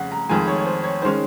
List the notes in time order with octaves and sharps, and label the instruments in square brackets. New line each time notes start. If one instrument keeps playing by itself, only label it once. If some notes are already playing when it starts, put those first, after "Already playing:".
Already playing: [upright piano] F2 C#3 F#5
A#5
F2 D#3 G#3 G#5
C#5
C#5
C5
C#5
D#3 G#3 C#4 C5